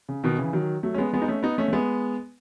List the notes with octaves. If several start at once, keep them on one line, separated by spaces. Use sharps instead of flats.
C#3
B2 D#3
C#3 E3
D#3 F#3
F#3 A3
C#4
G#3 B3
G#3 B3
D#4
A3 C#4
B3 D#4
A3 C#4
A3
G#3 B3